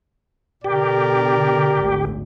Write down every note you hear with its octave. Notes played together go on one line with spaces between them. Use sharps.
B2 D3 G4 A#4 D5
G#1 D2